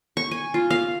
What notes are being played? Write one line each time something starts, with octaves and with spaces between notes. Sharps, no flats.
C#6
G#5
F4
F5